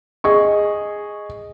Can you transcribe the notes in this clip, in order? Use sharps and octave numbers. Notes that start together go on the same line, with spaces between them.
G#4 D#5 C#6